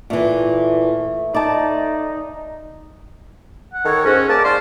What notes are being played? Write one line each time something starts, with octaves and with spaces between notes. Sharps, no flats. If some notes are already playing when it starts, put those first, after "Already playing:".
A#2 E3 A3
D#4 D5 A5
F#5
D#3 A4 C#5
G#2 C#4 F#4
A#3 G#4 D5 A5
G#2 C5 D5 F5